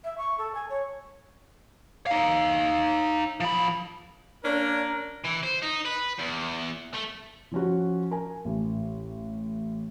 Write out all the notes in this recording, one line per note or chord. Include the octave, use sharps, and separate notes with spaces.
E5
C#6
A4
G#5
C#5
D#4 F5
F3 B5
A#3 C#4 D4 A#4
E3
C5
D#4
B4
E2
A3
F3 C#4 F#4
A#4 G#5
A1